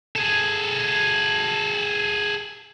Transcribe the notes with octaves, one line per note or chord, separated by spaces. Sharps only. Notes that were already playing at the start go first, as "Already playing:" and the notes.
G#4 A4